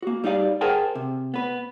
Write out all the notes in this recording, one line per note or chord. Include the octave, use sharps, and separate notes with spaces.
A#3 F#4
G3 D#4 D5 F5
G#4 A#4 C5 F#5 G5 A5
C3
B3 B4